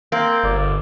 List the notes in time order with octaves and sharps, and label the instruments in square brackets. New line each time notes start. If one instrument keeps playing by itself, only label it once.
[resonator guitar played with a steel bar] A#3 [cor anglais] C4
[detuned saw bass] G1 [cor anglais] D5